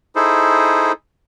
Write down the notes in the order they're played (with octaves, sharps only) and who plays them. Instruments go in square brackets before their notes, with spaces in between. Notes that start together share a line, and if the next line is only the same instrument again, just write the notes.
[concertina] D#4 E4 G#4 A4 C5